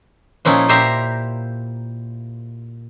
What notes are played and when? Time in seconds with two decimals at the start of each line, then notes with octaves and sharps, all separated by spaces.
0.45 A#2 F3 C#4 D#4 E4
0.69 A#2 G4 C5 E5 A#5